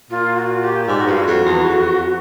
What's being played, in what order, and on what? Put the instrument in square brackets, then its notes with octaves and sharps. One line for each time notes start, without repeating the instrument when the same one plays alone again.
[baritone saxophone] A#2 [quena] F4
[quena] F#4
G4
[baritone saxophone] G#2 [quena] G4
[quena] F#4
[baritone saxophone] G2 [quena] F4
[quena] F#4
[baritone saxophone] F2
E2
F2